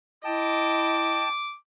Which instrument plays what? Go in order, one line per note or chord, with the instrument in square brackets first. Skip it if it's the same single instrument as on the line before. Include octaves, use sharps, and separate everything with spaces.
[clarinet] E4 [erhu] D#5 [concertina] G5 A5 [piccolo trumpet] D6